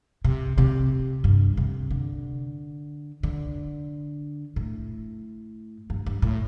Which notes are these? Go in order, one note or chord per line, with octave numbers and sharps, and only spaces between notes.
C3
C3
G2
C3
D3
D3
A2
G2
G2
A2